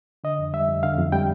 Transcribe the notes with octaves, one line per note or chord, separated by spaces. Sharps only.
D3 D#5
F2
G3 E5
F2
D3 F5
F2
G3 G5